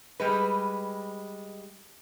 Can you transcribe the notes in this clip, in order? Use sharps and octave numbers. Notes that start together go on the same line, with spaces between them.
G3 G#3 B4